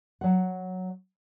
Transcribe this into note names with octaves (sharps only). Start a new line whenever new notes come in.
F#3 F#5